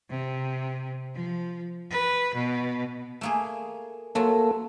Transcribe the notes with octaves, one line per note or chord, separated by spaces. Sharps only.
C3
F3
B4
B2
A3 A#3 G#4
F#3 A3 A#3 F4 A4